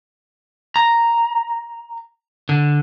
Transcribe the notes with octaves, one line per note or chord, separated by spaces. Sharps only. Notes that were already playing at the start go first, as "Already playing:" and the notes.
A#5
D3